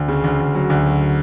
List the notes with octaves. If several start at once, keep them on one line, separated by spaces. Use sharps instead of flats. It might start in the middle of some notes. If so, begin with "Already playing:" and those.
Already playing: D2
C#3
D2
D2
F#3
D2
F#3